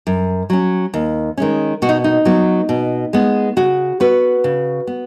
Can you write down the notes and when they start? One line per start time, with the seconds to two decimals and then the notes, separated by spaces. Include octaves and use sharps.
0.07 F#2
0.50 F#3 C#4
0.94 D#2
1.37 D#3 G#3 C#4
1.82 B2 F#4
1.89 D#4
2.04 D#4
2.25 F#3 B3
2.69 B2
3.13 G#3 B3
3.57 C#3 F#4
4.00 B3 F#4 B4
4.44 C#3
4.87 B3